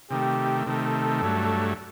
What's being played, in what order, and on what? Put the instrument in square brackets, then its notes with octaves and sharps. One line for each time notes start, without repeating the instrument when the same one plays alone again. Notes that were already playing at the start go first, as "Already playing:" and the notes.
[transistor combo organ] C3 D#3 A3 [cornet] G4
[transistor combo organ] C3 D#3 A3 [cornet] A4
[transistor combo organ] G2 F#3 A3